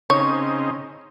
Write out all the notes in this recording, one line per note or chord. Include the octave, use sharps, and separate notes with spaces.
C#3 C4 D#4 C#5